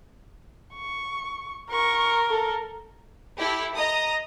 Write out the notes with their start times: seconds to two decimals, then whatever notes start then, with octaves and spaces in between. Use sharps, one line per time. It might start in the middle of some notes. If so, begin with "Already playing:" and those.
0.75 C#6
1.72 A#4 C#6
2.30 A4
3.38 E4 G4 A4
3.75 D#5 A#5 D#6